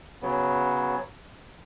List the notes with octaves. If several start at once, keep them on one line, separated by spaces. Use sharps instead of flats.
C#3 F#3 B3